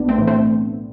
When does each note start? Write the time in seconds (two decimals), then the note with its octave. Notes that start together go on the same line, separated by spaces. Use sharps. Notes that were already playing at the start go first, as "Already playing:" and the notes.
Already playing: B1 B3 D4
0.09 A3 C4
0.18 A2 E3
0.27 A3 C4